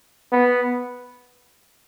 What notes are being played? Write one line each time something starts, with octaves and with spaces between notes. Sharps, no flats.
B3